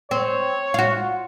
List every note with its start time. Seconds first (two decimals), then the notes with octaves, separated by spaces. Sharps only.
0.11 C4 C#5
0.74 F4 F#4